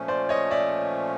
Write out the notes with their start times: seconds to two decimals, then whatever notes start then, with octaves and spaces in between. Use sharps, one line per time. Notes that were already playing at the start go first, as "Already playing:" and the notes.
Already playing: A#2 F3 A3 C#4
0.08 C5 D5
0.29 C#5 D#5
0.50 D5 E5